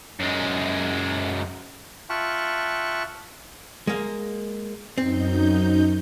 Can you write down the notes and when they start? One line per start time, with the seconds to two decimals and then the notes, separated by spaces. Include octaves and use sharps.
0.20 F#2 G#3
2.10 F4 E5 G5 A5 C#6 F#6
3.87 G#3 A#3
4.98 F#2 C4 D#4 G6